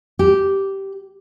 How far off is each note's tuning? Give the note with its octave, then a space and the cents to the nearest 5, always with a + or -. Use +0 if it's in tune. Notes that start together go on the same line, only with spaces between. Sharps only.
G4 -10